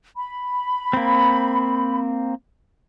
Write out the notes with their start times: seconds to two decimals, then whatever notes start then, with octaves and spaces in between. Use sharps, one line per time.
0.17 B5
0.93 A#3 C4